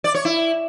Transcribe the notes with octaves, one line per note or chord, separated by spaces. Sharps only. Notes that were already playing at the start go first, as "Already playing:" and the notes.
D5
C#5
E4